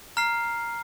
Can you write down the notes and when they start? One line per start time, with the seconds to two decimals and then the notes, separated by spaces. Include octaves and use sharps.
0.17 A#5 F6 C7